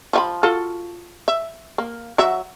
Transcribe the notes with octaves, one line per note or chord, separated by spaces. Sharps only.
F3 E5 B5
F4 F#4 A4
E5
A#3
F#3 F#4 E5